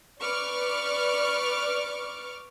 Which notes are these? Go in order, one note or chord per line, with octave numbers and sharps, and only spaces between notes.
B4 D5 C#6 D6 F6